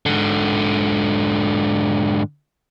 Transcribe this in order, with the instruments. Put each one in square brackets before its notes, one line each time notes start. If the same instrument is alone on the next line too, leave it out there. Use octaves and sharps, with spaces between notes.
[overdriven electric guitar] G#2 D3